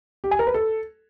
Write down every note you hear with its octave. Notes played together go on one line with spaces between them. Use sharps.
G4
G#5
A#4
B4
A4